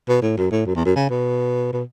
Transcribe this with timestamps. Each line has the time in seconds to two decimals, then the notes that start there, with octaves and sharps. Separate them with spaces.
0.08 B2
0.22 A2
0.38 F#2
0.51 A2
0.66 F#2
0.76 E2
0.85 F#2
0.96 C#3
1.10 B2
1.73 B2